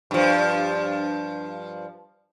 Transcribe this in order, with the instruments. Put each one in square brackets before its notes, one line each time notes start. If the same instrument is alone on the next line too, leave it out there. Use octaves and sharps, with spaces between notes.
[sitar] G2 F3